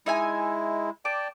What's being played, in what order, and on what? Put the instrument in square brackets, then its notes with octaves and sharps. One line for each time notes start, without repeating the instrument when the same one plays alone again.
[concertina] G#3 E4 [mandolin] D#4 E5 G#5
[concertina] D5 G5 A5 [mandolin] D6